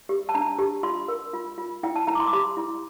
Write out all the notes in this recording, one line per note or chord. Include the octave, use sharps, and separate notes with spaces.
G4
A5
D4 A#5
G4
F4 C6
A#4
F4
F4
E4 G5
A5
E4 A#5
D6
C6
D6
G4 C6
E4